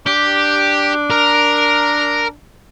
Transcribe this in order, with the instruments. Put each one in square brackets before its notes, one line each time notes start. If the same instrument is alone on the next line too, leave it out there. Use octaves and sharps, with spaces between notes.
[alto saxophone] D4 [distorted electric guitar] G4
[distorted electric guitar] A#4